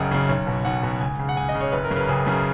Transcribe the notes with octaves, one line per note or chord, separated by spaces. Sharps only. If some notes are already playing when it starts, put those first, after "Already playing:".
Already playing: F#1 F#2 C#3 D#5 F#5
F#2 C#3
B1
B2
B1 F#5
B2
C#2 G#5
C#3
F#5
C#2 G#5
D#5
C#3
C#5
F#1 B4
A#4
F#2 C#3
B4
F#1 G#4
F#2 C#3